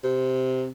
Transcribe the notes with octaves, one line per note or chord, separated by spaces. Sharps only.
C3